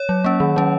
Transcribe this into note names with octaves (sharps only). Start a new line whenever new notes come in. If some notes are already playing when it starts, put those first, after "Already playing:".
Already playing: C#5
F#3
A#3 C#4
D#3
F#3 C#4